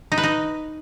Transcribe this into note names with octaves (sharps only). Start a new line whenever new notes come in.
D#4
B4
D#4